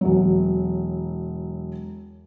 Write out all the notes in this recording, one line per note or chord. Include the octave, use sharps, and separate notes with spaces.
E1 F#3